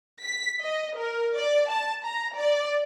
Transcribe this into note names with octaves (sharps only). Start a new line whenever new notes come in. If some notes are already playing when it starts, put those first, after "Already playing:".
B6
D#5
A#4
D5
A5
A#5
D5